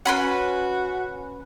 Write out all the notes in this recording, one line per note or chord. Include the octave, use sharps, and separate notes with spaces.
C#4 F#4 B4 F#5 B5 C6